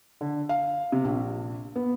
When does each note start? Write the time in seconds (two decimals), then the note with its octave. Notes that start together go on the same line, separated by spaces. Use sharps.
0.21 D3
0.49 F5
0.92 C3
1.04 A#1
1.76 B3